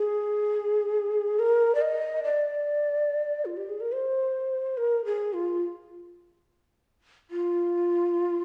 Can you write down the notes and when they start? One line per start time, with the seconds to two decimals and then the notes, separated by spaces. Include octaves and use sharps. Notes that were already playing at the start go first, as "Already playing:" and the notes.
Already playing: G#4
1.39 A#4
1.75 D5
1.81 D#5
2.24 D5
3.45 F4
3.57 G4
3.69 G#4
3.80 A#4
3.92 C5
4.77 A#4
5.05 G#4
5.33 F4
7.30 F4